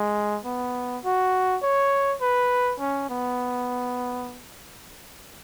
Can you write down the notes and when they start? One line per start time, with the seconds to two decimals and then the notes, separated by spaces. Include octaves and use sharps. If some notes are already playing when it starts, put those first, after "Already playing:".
Already playing: G#3
0.45 B3
1.05 F#4
1.62 C#5
2.21 B4
2.80 C#4
3.10 B3